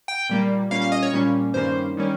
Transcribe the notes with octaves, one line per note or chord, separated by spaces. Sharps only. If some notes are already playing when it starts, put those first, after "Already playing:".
G5
A#2 G3 A#3
A#2 G3 A#3 C#4 F5
F5
D#5
C#5
A#2 G3 A#3 C#4
G2 D#3 G3 A#3 C#4 C5
D#3 G3 A#3 C#4